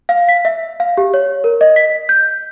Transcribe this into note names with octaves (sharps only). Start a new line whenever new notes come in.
F5
B6
E5
F5
G4
C#5
A#4
D#5
B6
G6